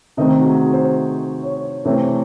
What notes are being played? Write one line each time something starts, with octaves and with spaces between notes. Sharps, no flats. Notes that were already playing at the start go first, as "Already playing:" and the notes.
C3 D#3 A3 C4 D#5
F#4
G#4
C5
C#5
C3 E3 A3 C4 C#5